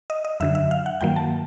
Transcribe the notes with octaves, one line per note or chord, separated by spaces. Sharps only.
D#5
D#5
F#2 D3 F#3 E5
E5
F5
F#5
G2 D#3 F#3 A#3 G5
A5